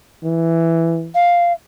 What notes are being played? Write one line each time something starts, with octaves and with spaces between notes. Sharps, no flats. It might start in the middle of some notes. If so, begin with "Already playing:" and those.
E3
F5